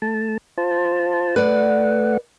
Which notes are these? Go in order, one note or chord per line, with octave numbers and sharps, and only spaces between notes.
A3 A5
F4 C5 A5
A3 B4 D5 F#5